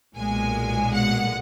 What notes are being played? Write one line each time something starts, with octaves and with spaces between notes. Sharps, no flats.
B1 A#2 G#3 G#5
F#5